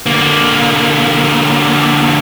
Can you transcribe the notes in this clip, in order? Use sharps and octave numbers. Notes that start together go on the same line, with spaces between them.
D3 A#3